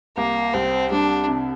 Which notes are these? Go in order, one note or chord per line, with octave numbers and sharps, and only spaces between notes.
C2 A#3
C2 C4
G3 D4
C3